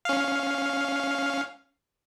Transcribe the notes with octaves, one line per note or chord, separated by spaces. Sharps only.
C#4 F5